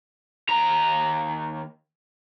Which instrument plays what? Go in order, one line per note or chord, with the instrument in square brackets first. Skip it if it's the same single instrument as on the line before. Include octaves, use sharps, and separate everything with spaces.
[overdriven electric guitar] D#2 A#5